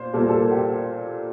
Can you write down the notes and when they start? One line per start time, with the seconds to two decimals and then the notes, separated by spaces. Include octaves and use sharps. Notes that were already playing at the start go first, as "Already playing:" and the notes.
Already playing: A#2 C5
0.13 A#2 G3 A#3 A4
0.21 A#4
0.28 A4
0.51 G4